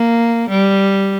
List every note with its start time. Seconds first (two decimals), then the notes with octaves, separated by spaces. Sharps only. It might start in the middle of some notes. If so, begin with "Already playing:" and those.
Already playing: A#3
0.50 G3